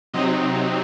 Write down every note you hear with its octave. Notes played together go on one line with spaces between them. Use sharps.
C3 F#3 C4 D#4 D#5